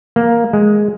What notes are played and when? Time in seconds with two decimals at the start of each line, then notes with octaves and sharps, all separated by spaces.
0.16 A#3
0.53 G#3